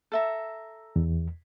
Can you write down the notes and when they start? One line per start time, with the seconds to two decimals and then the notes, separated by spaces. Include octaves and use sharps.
0.12 A4 E5 A#5
0.96 E2